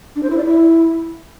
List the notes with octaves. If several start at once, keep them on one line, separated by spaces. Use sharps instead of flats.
D4
C5
E4
D5
E4